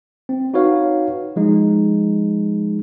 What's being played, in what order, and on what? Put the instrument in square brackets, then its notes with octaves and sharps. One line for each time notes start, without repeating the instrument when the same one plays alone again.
[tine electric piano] C4
D#4 F#4 B4 C#5 F5
F3 G#3 D#4